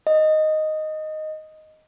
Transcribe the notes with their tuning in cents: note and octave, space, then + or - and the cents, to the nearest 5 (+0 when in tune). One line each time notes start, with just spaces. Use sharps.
D#5 +0